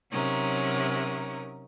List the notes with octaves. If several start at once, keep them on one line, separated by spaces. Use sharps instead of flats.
C3 F#3 C#4 D#4 A#4